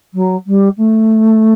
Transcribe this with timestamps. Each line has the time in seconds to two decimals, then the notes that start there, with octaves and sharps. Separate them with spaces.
0.14 F#3
0.46 G3
0.77 A3